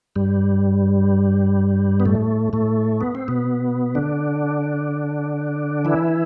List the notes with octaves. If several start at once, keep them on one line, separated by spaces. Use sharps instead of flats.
G2 G3
B3
A2 A3
A2 A3
B3
C4
B2 B3
D3 D4
E3 E4